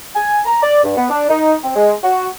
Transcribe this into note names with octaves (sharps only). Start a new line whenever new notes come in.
G#5
A#5
D5
G2
B3
D4
D#4
C4
G#3
F#4